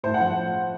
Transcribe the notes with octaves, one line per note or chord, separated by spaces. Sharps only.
A2 C5
F#5
F3